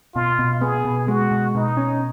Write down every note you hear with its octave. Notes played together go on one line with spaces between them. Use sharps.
B2 F4
B2
B3 G#4
B2
G#3 F#4
B2
B2 D#4
C#4